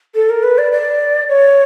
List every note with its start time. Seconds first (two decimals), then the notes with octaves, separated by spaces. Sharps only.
0.14 A4
0.29 A#4
0.43 B4
0.57 D5
0.71 D5
1.28 C#5